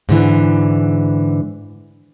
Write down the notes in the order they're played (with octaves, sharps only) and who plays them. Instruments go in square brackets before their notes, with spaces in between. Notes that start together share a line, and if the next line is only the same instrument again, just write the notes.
[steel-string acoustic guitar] G#2 D3 E3